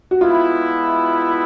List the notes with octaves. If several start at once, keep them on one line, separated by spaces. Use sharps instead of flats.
F#4
G#3 B3 E4 F4